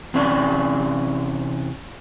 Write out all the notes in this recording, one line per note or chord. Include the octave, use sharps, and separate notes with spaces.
C3 E3 C#4 D5 A5